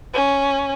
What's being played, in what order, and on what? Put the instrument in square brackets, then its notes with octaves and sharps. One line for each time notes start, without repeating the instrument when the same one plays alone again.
[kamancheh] C#4